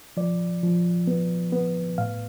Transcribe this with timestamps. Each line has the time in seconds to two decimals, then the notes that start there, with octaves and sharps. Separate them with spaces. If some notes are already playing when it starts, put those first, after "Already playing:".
0.17 F3 D5
0.63 F3
1.07 B3
1.52 B3
1.98 A2 F5